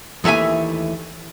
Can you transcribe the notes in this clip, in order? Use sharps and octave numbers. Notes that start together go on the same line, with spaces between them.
D#2 E3 A3 E5 G#5